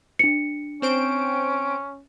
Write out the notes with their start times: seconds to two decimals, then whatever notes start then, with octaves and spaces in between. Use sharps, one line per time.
0.19 D4 C#7
0.82 C4 C#4 C5 D7